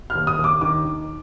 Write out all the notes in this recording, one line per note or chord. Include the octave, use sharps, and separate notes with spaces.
F6
D#2
D#6
D#2
D6
D#3 D6
D#3